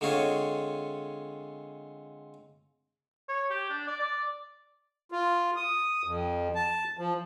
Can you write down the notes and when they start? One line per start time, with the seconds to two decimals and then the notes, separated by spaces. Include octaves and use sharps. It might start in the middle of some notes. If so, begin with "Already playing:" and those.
0.01 D3 G#3 C4 F4 G#4 C#5
3.29 C#5
3.50 G4
3.70 D4
3.87 D5
4.00 D5
5.12 F4
5.56 D#6
6.04 F2
6.55 A5
6.98 F3